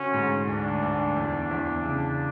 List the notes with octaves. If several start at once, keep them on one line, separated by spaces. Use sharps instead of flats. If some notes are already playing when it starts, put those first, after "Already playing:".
Already playing: D3 C#4 F#4
G#2
D2 D4
D2
E2
E2
C#3